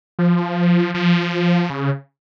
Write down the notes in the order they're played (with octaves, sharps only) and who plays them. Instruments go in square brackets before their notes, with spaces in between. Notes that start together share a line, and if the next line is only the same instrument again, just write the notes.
[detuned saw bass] F3
F3
C#3